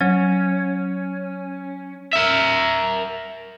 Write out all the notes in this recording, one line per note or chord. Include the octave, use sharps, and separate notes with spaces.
F#3 C#4
A#4 E5